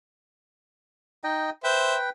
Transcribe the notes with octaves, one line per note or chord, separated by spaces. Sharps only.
D#4 D#5 G5
B4 C5 E5 G5